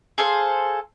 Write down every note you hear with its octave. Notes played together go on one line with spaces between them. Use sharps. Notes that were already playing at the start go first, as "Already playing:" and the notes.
G#4 A4 C5 F5